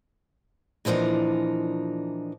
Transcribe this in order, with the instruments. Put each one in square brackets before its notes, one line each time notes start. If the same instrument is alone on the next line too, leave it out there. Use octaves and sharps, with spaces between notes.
[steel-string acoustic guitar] A#2 E3 F3 D4 D#4